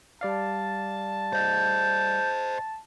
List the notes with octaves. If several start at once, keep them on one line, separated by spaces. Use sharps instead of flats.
G3 D5 F5 A5
C5 D#5 G6